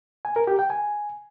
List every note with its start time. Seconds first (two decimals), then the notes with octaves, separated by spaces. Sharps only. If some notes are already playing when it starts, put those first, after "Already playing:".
0.25 G#5
0.36 A#4
0.47 G4
0.59 G5
0.70 G#5